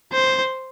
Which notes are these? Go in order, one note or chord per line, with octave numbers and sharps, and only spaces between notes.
C5